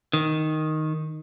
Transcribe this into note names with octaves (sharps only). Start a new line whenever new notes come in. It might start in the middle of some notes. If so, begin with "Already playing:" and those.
D#3